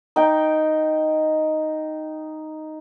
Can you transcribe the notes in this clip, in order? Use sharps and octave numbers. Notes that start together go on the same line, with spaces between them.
D#4 G5